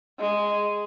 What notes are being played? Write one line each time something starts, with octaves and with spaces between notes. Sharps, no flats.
G#3